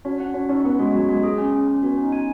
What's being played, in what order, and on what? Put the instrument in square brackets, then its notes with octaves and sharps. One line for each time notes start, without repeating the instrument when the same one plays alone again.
[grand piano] C#4 [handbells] F#4
[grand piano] C#4 [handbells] F#5
[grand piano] C#4 [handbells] F#4
[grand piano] C#4 [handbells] D#4
[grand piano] B3 [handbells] F#5
[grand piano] G#3 [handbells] F#4
[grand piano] F#3 [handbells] F#4
[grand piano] G#3 [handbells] F#4
[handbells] G#4
C#4
C#4
C#4
[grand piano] B3 [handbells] F#4
[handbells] C#4 [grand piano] D#4
[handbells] G#5